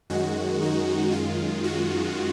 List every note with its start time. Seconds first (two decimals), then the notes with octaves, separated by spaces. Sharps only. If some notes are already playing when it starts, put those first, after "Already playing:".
0.10 F#2 D#3 G#3 F#4
0.62 D#4
1.12 F#2 D#3 G#3 F4
1.64 F#4